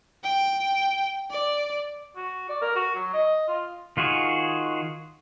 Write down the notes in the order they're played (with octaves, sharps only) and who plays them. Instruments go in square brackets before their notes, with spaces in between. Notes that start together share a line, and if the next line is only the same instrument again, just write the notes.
[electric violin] G5
D5
[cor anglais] F#4
D5
A#4
F#4
F#3
D#5
F4
[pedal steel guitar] D#3 F4 F#4 G#4